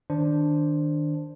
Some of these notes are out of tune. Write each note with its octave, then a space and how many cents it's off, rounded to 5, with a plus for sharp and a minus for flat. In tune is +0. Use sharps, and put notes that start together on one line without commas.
D#3 +0 D4 +0 C5 +0